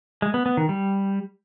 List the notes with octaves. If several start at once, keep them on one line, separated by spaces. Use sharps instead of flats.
G#3
B3
B3
D#3
G3